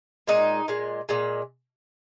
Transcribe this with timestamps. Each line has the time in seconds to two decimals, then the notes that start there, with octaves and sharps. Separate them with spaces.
0.27 A#2 G#3 D#4
0.68 A#2 G#3
1.09 A#2 G#3